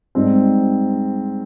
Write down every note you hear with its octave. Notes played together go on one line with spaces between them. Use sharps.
G#2 G3 C4